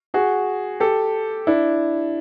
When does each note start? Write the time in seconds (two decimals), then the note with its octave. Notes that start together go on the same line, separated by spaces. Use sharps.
0.14 F#4 G#4
0.80 G4 A4
1.47 D4 E4